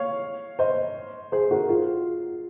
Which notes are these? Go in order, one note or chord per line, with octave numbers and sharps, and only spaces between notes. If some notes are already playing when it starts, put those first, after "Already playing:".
Already playing: C#5 F5
C5 D#5
G#4 C5
F#4 A#4
F4 G#4